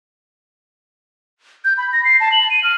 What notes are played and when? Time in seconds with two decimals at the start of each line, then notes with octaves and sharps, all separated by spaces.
1.65 G6
1.78 B5
1.93 A#6
2.05 C7
2.20 A5
2.32 F#7
2.50 D#7
2.63 F6